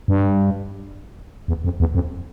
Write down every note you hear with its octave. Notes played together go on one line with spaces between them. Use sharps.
G2
E2
F2
E2
F2